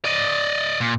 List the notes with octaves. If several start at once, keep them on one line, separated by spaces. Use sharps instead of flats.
D5 D#5
A#2